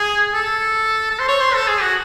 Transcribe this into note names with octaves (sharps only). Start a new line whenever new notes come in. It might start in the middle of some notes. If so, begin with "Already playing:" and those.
Already playing: G#4
A4
A4
C5
C#5
C5
A4
G#4
F#4